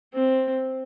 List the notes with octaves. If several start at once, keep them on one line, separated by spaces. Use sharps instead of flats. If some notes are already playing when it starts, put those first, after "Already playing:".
C4